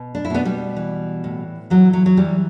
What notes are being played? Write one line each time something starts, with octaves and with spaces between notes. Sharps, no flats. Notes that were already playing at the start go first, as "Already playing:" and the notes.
Already playing: B2
D4
E4
B2 B3 D4
G3
E3
A2
E3 F#3
F#3
F#3
E3 G3